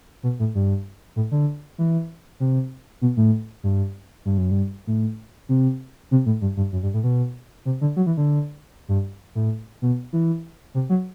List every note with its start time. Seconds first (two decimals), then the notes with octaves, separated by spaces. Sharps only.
0.23 B2
0.39 A2
0.55 G2
1.16 A2
1.31 D3
1.78 E3
2.40 C3
3.02 B2
3.17 A2
3.63 G2
4.25 G2
4.38 F#2
4.51 G2
4.87 A2
5.49 C3
6.11 C3
6.26 A2
6.41 G2
6.57 G2
6.72 F#2
6.83 G2
6.94 A2
7.04 B2
7.65 C3
7.81 D3
7.96 F#3
8.06 E3
8.17 D3
8.88 G2
9.35 A2
9.82 B2
10.13 E3
10.74 C3
10.90 F#3